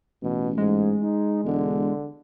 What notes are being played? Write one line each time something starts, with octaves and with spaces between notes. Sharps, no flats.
A1 B2
G#2 G#3
D#4
E1 D3